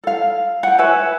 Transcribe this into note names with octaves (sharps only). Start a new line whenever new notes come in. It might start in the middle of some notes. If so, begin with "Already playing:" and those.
A4 F5
F#5 G5
B4 C#5 E5 G#5